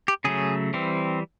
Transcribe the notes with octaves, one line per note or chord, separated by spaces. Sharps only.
G4
C#3 F#3 A3 G#4
E3 G3 C4